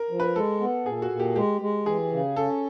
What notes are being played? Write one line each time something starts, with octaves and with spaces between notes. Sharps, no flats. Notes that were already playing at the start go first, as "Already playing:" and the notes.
Already playing: A#4
F3
B4
G#3 A4
B3
A#2 G#4
F#4
A#2
G4
G#3 G4
G#3
E3 G#4
C#3
C#4 A4